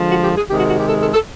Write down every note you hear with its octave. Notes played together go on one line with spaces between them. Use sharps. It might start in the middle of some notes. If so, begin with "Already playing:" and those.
Already playing: D3 F3 G#3
F#4
G4
G#4
C3 D#3 G#3 G4
F#4
F#4
G4
A4
A4
A4